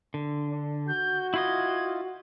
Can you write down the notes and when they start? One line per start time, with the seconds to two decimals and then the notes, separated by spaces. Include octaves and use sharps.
0.14 D3
0.48 D4
0.88 F#4 G6
1.34 E4 F4 D#5 G#6